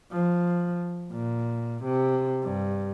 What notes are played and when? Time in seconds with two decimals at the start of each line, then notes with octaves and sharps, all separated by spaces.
0.12 F3
1.12 A#2
1.84 C3
2.43 G2